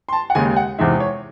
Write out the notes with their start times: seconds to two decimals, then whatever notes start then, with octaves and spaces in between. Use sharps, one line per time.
0.09 C6
0.13 A5
0.30 F#5
0.35 D#2 C#3 G#3 G#5
0.57 F#5
0.79 E2 C3 D#3 G#3 E5
1.00 C#5